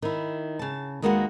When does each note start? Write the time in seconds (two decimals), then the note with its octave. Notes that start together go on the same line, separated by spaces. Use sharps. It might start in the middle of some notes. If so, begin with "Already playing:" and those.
0.02 D#3 E4
0.59 C#3 A5
1.02 D#2 G#3 A#3 B3 F#4 F#5